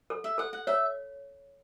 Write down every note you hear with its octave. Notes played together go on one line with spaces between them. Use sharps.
A4
E5
A4 F#5
F#5
C#5 E5